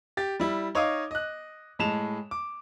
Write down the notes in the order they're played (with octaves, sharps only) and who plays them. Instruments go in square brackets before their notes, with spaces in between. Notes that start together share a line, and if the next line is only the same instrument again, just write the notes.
[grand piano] G4 A6
G3 E4
D#4 C#5 D#5 F5 D6 D#6
D#5 F#6
A2 G#3 A5 E7 F7
D6